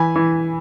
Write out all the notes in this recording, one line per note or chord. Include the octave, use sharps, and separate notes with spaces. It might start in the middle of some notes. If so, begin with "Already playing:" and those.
Already playing: E3 G#5 B5
E3